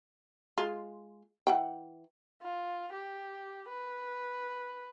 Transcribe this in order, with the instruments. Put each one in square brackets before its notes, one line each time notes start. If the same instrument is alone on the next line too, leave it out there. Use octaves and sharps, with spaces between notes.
[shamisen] G#3 F4
E3 F#5 G5
[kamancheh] F4
G4
B4